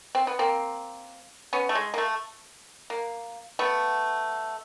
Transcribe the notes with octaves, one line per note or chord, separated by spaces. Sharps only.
C4
B3
A#3 C4
B3 C#4
A3
G#3
A#3
A3
A#3
A3 B3